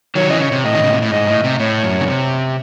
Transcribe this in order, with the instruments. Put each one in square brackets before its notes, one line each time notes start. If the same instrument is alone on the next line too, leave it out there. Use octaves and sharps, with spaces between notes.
[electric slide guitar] D#3 F#3 [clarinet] C#5
[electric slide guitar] C#3 E3 [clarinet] D#5
[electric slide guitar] C#3 [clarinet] C#5
[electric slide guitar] C3
[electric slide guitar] A2 [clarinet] D#5
[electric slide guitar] D#3
C#3
C3
A2
[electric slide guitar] G#2 [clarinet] D#5
[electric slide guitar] A2
C3
[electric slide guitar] A2 [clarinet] C#5
[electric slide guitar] F#2
C#3
C3